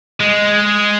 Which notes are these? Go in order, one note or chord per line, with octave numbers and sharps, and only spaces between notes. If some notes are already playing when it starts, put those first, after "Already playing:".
G#3